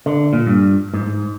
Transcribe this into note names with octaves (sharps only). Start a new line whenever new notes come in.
D3
A#2
G2
G#2